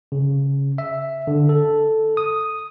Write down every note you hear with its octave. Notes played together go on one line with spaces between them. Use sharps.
C#3
E5
D3
A4
D#6